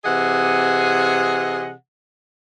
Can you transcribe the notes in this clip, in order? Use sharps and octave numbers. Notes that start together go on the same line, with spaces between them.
C3 E3 G#4 D#5 F#5